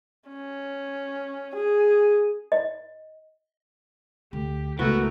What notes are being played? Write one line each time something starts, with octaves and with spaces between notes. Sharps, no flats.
C#4
G#4
D#5
D2 G4
C#2 E3 A3 B3 F#4 A#4